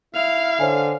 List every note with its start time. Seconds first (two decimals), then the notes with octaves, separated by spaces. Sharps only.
0.15 E4 F5 F7
0.60 D3 C5 C#5 G#5